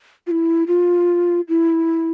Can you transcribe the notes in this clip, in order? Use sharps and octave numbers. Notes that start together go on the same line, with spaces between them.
F4
E4
F4
E4